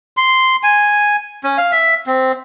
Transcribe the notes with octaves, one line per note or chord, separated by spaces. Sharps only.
C6
G#5
C#4
F5
E5
C4